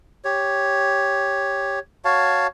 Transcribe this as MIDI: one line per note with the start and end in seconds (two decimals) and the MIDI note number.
0.25 1.79 67
0.25 1.79 73
2.05 2.47 66
2.05 2.47 73
2.05 2.47 77
2.05 2.47 81